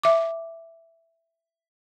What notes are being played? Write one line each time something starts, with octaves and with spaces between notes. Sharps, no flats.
E5 D6